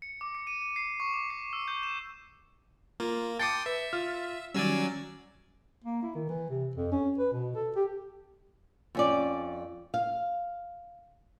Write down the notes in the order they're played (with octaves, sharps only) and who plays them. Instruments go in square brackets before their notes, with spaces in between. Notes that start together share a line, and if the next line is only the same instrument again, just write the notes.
[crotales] C#7
D6
C#7
D#7
D#7
C7
C#6
D6
C7
E6
G6
E7
[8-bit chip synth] A#3 [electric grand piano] F4
[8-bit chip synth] G5 C6 D#6 [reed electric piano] A5 D6 [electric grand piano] A6 C#7
[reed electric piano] B4 [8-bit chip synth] E5
[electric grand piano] F4 [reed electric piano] F6
[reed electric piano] D#3 G3 [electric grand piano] F#3 C#4 [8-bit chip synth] D5 G#5 E6
[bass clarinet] A#3
E4
D#3
E3
C3
F2
C#4
B4
B2
A4
G4
[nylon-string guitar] F2 C#4 D5
F5